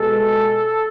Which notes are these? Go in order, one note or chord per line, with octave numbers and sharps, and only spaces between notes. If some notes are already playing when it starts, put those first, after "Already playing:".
Already playing: B2 G#3 A4